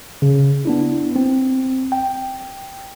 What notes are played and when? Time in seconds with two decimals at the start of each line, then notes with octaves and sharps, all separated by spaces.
0.22 C#3
0.65 B3 D4 E4
1.16 C4
1.92 G5